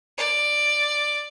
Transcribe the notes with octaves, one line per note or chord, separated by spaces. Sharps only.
D5